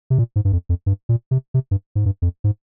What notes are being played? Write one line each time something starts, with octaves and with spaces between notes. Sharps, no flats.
C3
A#2
G#2
G2
F2
F2
G2
A#2
C3
C3
G2
G#2
G2
F2
G#2